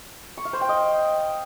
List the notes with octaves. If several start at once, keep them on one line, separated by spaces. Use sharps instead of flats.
C#6
F5
C5
G5
D#5